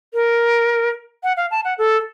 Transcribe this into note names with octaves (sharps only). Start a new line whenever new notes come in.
A#4
F#5
F5
A5
F#5
A4